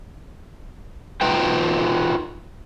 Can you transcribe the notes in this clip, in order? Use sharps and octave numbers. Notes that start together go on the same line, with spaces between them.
D#4 F4 F#4 B4 G5